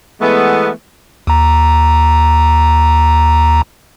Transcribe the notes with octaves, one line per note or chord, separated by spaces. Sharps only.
E3 G#3 A3 B3
D#2 A#5